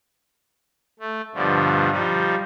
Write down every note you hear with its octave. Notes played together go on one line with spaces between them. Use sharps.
A3
G2 B2 D3 F3
F3 G3 D#4